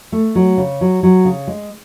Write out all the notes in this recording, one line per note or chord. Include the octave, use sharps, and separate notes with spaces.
A3
F#3
C#3
F#3
F#3
C#3
G#3